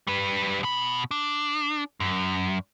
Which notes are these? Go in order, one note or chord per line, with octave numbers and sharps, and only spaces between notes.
G3 B4
B2 B5
D4
F#2